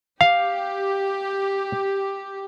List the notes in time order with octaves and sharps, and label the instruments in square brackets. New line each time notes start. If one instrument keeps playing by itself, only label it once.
[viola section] G4 [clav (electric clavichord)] F5